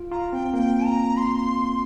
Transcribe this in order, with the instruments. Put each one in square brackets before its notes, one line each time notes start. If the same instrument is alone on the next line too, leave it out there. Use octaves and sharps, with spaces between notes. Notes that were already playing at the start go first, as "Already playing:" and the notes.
Already playing: [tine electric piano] F4
[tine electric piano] F4 [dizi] A#5
[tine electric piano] C4 [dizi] G5
[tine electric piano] A#3 [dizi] G5
[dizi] A#5
C6